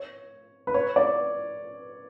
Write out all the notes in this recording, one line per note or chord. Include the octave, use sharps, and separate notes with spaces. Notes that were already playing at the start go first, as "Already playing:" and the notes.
Already playing: C#5
B4
C#5
D5